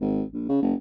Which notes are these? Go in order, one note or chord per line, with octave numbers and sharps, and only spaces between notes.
G#1
A#1
C#3
F#1